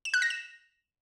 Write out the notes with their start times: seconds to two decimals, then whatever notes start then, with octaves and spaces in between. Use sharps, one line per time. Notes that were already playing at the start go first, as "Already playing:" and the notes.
0.05 E7
0.14 F#6
0.22 A#6
0.30 E7